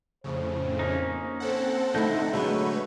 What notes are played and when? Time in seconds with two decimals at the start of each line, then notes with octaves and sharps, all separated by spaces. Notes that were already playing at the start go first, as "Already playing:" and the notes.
0.24 F2 A2 C#3 C5
0.79 A#3 C#4 D#4
1.40 C4 A4 C5 F#5
1.94 D3 F3 A3 D#4 E4 D#5 G6
2.33 D3 F#3 G#3 A3 B3 B4 C#5